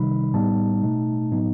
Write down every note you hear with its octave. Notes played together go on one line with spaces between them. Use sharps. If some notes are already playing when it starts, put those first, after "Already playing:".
Already playing: C3 D#3 G3 D#4 B5
A2 G3 B3 D#4 A5
B2 A3 D#4
A2 F#3 B3 D#4